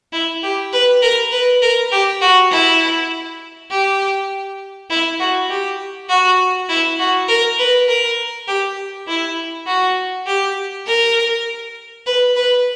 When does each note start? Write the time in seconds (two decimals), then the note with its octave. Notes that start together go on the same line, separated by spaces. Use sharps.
0.13 E4
0.43 G4
0.73 B4
1.02 A#4
1.32 B4
1.62 A#4
1.92 G4
2.21 F#4
2.51 E4
3.71 G4
4.90 E4
5.20 F#4
5.49 G4
6.09 F#4
6.69 E4
6.99 F#4
7.28 A#4
7.58 B4
7.88 A#4
8.48 G4
9.08 E4
9.67 F#4
10.27 G4
10.87 A#4
12.06 B4
12.36 B4